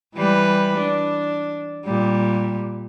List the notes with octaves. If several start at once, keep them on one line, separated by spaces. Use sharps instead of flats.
E3 G3 B4
D4
A#2 G3